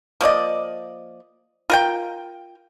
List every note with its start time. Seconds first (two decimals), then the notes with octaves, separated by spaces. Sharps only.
0.21 F3 A#3 D5 D#5
1.70 F4 A#4 G5